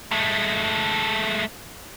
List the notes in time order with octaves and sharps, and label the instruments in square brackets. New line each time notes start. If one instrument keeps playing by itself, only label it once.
[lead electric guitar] G#3 A3